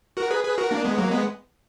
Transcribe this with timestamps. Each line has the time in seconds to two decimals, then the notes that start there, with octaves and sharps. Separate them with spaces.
0.17 F#4 A#4
0.30 G#4 B4
0.44 G#4 B4
0.58 F#4 A#4
0.71 A#3 D4
0.84 G#3 B3
0.98 F#3 A#3
1.11 G#3 B3